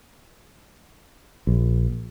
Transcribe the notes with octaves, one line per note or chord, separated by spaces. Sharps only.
A#1